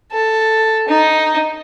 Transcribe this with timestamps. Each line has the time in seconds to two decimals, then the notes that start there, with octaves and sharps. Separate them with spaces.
0.12 A4
0.89 D#4